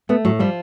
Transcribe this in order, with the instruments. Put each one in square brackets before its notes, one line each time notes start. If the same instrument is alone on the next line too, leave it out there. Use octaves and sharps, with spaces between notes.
[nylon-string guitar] A3 [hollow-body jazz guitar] B3
[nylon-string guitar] A2 [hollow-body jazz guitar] F#3
[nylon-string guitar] F3 [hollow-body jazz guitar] G3